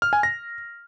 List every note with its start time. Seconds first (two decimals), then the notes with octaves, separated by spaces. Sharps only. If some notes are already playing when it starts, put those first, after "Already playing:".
0.02 F6
0.13 G#5
0.23 A#6